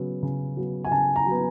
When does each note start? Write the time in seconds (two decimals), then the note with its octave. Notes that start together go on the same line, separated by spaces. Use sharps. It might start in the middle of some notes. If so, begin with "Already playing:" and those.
Already playing: C#3 F#3 B3
0.23 C#3
0.57 F#3 B3
0.85 G#5
0.91 C#3 A5
1.16 A#5
1.27 F#3 B3